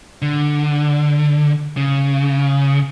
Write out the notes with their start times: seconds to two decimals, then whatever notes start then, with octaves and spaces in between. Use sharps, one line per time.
0.22 D3
1.77 C#3